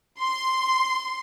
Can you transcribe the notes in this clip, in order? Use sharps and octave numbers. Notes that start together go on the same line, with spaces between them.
C6